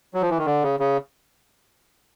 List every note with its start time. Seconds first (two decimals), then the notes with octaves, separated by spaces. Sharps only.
0.14 F#3
0.22 F3
0.30 E3
0.38 D#3
0.46 D3
0.63 C#3
0.80 C#3